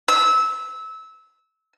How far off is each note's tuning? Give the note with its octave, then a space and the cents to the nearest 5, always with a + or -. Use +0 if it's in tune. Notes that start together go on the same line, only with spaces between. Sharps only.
E6 -20